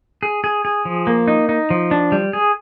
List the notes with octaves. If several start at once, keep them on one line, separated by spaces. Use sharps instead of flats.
G#4
G#4
G#4
F3
A#3
D#4
D#4
F3
D4
G3
G#4